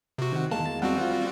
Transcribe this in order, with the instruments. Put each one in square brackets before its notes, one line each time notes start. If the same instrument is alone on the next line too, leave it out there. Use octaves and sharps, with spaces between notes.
[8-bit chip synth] C3 F#4
[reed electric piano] D#3
[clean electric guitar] E2 G#3 A#3 [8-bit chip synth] A5
[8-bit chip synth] G3 C4 F#4 [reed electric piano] F#5
[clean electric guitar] F4